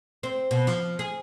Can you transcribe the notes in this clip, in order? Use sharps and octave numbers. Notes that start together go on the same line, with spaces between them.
C4
B2
F3
G#4